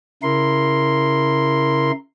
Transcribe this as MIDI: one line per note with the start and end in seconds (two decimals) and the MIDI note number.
0.23 1.92 49
0.23 1.92 64
0.23 1.92 70
0.23 1.92 84